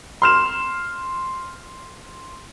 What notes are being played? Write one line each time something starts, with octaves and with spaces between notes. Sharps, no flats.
C6 F6 E7